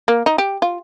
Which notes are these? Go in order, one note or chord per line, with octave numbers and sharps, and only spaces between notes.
A#3
D#4
G4
F4